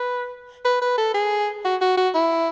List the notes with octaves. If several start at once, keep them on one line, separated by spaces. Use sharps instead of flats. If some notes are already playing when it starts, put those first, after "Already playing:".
Already playing: B4
B4
B4
A4
G#4
F#4
F#4
F#4
E4